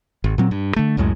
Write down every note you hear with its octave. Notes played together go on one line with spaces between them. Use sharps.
G#1
A#2 F#3 C4
G2
D3 A3
C#2 F#2 A2 G#3